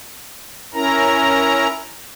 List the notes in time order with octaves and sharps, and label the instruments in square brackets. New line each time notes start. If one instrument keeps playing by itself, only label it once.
[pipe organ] C#4 E4 A#4 A#5